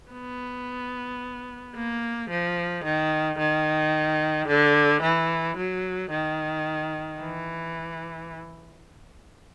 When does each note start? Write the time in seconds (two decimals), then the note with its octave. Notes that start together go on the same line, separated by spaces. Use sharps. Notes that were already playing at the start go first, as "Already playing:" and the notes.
0.11 B3
1.75 A#3
2.29 F3
2.84 D#3
3.38 D#3
4.47 D3
5.02 E3
5.57 F#3
6.10 D#3
7.19 E3